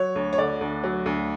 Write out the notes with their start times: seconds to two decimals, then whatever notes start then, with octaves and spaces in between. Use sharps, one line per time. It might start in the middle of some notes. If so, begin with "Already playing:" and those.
Already playing: F#3 C#5
0.16 D2
0.33 C#5
0.38 D3 D5
0.61 D2
0.84 F#3
1.06 D2